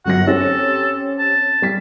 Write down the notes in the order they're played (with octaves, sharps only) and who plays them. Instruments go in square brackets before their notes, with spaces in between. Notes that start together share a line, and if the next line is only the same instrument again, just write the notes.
[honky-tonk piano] G1 F#2 A#6 [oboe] F#5
[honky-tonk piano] C4 C#4 G4 [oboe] A4
[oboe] A5
[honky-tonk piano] G3 B6